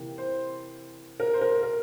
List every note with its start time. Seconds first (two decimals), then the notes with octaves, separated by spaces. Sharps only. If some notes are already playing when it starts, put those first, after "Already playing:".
Already playing: C3 E3 A#3
0.18 C5
1.20 A#4
1.34 C5
1.41 A#4
1.63 A#4